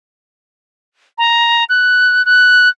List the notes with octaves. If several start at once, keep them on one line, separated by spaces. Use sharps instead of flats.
A#5
F#6
F#6